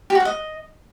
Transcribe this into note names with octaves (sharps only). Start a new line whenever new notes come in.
G4
F#4
F#5
D#5